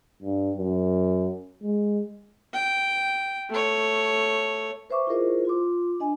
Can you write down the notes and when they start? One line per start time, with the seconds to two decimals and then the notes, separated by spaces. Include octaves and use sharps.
0.22 G2
0.57 F#2
1.63 G#3
2.53 G5
3.50 A3 C#5
4.90 B4 C5 E5 C#6 D6
5.07 E4 F4 G#4 A#4 C5 D#5
5.45 F4 C6 D6
6.00 D4 D#5 G#5